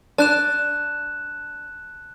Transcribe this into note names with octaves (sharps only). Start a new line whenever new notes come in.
D4 A5 F#6 E7